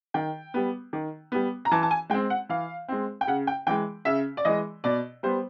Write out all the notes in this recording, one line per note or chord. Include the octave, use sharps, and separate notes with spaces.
D#3 G5
G3 B3
D#3
G3 B3
A#5
E3 A5
A5
G#5
G#3 C4 G5
F#5
E3 F5
G#3 C4
G5
C#3 F#5
G5
E3 G#3 G5
C#3 E5
D5
E3 G#3 D#5
B2 D5
G3 B3 C5